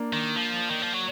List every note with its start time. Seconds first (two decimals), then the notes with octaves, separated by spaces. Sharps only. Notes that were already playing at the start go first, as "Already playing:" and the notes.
Already playing: A#3 D4
0.13 D#3
0.36 F3
0.70 D#3
0.81 F3
0.93 F#3